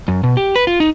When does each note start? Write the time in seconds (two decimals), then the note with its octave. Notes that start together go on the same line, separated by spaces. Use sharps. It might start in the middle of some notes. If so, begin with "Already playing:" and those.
0.08 F#2
0.24 B2
0.37 G4
0.56 B4
0.67 F4
0.80 D#4